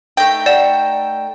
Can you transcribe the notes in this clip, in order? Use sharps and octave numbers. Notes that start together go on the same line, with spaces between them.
A3 D#4 G5
D5 F#5 E7